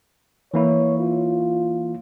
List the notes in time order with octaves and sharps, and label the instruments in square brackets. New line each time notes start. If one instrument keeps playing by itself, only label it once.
[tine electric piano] E3 A#3 E4 [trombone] C#5
[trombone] F4